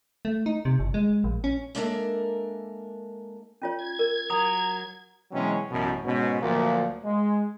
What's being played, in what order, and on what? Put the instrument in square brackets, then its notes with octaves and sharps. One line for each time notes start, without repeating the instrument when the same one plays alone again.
[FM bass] A3
D#4
C3
G1
G#3
A#1
C#4
[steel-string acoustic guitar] G#3 A#3 D4 A4 A#4 E5
[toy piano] C#4 F4 C#5
[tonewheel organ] G#6
[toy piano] A#4
[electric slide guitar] F#3 A#5 [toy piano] D#6
[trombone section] B2 E3 F#3 G#3 C4 C#4
A1 F#2 B2
G#2 B2 C#4
D2 A#2 F3 F#3 A#3
G#3